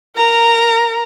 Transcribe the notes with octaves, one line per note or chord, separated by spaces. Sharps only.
A#4 A#5